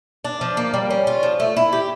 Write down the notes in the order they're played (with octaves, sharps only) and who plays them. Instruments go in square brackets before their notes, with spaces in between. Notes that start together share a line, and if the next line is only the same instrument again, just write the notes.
[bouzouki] D4
F3
A#3
G3
C#4
F4
F3
A3
E4
G4